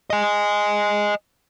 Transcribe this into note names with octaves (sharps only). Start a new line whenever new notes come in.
D#5 G#5